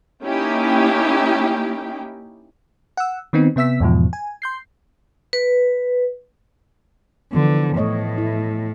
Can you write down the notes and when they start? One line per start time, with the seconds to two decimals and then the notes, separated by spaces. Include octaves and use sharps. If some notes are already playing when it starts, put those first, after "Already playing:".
0.24 A#3 C#4 D#4 E4 G4 G5
2.97 F#5 E6
3.33 D#3 B3 C4 D#4
3.56 C3 B3 E5 E6 B6
3.80 E2 G#2 B2 F3
4.13 G#5
4.42 C6 G6 C7
5.33 B4
7.33 D3 E3 F3 B3
7.76 A2 A3 C#5 D#5
8.18 E4